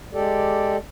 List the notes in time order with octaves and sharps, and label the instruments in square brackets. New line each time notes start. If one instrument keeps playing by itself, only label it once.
[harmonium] G#3 G4 A4 D5